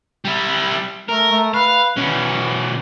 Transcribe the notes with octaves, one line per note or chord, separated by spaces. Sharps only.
G3 E4
A3 A#4
A3
B4 F5
B2 E3 C#4